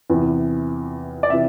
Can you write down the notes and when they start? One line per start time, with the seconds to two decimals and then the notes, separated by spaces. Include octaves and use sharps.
0.10 E2 C3 E3
1.23 D5
1.30 C3 E3 E5